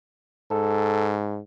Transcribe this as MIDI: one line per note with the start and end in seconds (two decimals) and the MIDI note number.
0.51 1.39 44
0.51 1.13 69